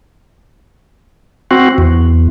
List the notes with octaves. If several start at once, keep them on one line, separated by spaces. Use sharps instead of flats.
C4 F#4
E2